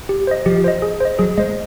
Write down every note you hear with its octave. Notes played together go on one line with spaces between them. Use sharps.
G4
C5 D#5
F3 G4
C5 D#5
G#4
C5 D#5
F#3 G#4
G#3 C5 D#5